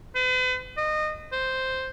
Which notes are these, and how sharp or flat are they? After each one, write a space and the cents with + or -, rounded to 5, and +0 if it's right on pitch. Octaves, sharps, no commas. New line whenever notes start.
B4 +45
D#5 -25
C5 -5